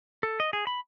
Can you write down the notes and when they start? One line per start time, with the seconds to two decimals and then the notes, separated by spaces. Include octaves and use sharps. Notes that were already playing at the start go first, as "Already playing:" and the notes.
0.23 A4
0.40 D#5
0.53 G#4
0.67 B5